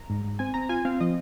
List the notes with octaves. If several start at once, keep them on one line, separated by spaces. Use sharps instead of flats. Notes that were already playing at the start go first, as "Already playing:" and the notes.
Already playing: A#5
G#2
G#2
C4 G#5
C4 A#5
F4 G#5
C4 F5
F3 D#5